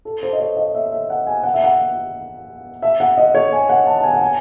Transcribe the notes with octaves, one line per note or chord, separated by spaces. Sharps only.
A4
C5
D#5
C#5
D#5
E5
E5
F#5
G#5
F#5
E5
F#5
E5
F#5
D#5
C#5
G#5
F#5
A5
A5
G#5
F#5
G#5